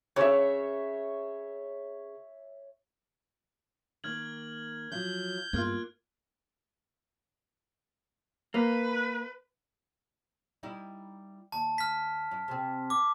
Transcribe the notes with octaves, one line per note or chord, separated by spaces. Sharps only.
C#3 C#5 E5
D#3 A#3 F6 G#6 F#7
F3 F#3 G6
G2 G#3 A#3 B3 F4 F6 F#6 G#6
A#3 B4
G3 D#4 E4
D#2 A5
F6 B6
F#2
C3 C4
D6